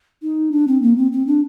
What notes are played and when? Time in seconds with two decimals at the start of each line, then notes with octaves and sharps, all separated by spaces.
0.23 D#4
0.52 D4
0.67 C4
0.82 A#3
0.97 C4
1.12 C4
1.27 D4